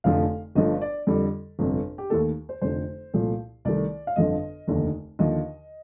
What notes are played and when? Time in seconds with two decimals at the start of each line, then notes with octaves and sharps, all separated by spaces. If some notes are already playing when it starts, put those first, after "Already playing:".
0.04 F1 F2 D3 F3 A3 F5
0.55 G1 G2 F3 A3 D#5
0.82 D5
1.07 F2 D3 G3
1.59 G1 F2 C3
1.98 G4
2.10 D#2 D#3 A3 A4
2.49 C5
2.61 F1 F2 D3 C5
3.14 C2 A#2 F3 A3
3.65 C2 C3 D#3 A3 D5
4.07 F5
4.16 G1 F2 D3 F3 D#5
4.68 F1 D#2 D3
5.19 D#2 D3 F3 D#5